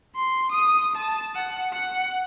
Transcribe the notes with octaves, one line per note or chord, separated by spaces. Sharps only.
C6
D#6
A5
F#5
F#5